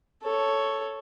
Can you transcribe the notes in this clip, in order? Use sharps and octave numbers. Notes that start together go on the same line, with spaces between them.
A4 C#5